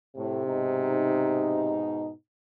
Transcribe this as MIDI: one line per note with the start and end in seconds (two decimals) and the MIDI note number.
0.17 0.43 45
0.17 1.81 48
0.46 2.11 44
0.46 2.11 47
0.46 2.11 63